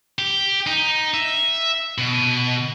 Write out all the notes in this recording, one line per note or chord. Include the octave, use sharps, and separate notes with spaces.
G4
D#4
E5
B2